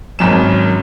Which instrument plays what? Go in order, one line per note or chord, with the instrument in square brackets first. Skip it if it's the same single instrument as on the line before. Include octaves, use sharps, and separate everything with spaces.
[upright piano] G#1 F#2 E7